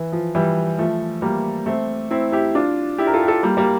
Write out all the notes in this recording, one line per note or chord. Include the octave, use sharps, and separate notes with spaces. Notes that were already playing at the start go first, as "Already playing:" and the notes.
Already playing: E3
F3
E3 G3
F3 A3
G3 A#3
A3 C4
C4 E4
E4 G4
D4 F4
E4 G4
A#4
F4 A4
G4
F4 A4
G3 A#3
G3 A#3